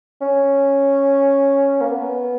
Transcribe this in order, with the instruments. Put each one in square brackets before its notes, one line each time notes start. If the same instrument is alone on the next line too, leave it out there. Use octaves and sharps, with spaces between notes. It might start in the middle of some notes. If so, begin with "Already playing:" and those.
[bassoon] C#4
A#3
B3